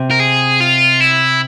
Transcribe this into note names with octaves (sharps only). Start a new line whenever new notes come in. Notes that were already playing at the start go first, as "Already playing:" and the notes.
Already playing: C3
A#4
G#4
F4
E4